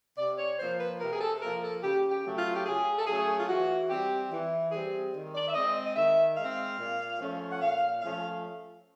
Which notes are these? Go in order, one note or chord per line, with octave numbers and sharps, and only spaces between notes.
C3 D5
C#5
F3 A#3 C5
B4
C3 A#4
G#4
A4
F3 A#3 A#4
A4
C#3 G4
G4
F#3 A3 C#4
F4
G4
C#3 G#4
A4
F#3 A3 C#4 G#4
F4
E3 F#4
G3 C4 G4
E3
G3 C4 G#4
D#3
D5
E5
G#3 C4 D#5
D#5
D#5
D#3 E5
G#3 C4 F5
A#2
F3 A3 C#4
F#5
A#2 F5
F3 A3 C#4 F5